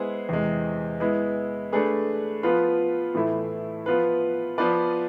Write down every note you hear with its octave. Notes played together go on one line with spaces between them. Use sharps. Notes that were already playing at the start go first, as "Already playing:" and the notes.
Already playing: G#3 B3 E4 G#4 C5
E2 C3 G#3
G#3 B3 E4
A3 D4 G#4 B4
F3 B3 F4 B4
A2 E3 A3 E4
F3 B3 F4 B4
F3 B3 F4 B4 D5